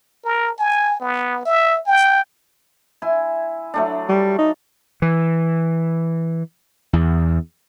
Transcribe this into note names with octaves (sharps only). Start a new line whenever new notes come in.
A#4
G#5
B3
E5
G5
E4 G#5 C6
F#3 A3 D4
G3
D#4
E3
E2